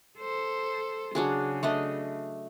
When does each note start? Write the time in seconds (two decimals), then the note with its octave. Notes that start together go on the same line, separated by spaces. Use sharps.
0.19 A4 C5
1.15 C#3 F#3 D4 G#4
1.63 A3 D4 D#5